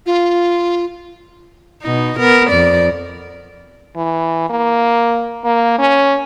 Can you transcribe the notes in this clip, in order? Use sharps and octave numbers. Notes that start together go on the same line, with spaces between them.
F4
B2 D#4
B3 A#4
F2 D5
E3
A#3
A#3
C#4